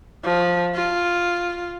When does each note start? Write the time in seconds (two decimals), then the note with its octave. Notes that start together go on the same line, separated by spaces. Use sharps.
0.25 F3
0.75 F4